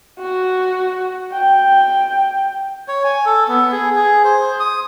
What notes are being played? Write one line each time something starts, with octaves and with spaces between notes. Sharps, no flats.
F#4
G5
C#5
G#5
A4
B3
G#4
G#4
C5
D#6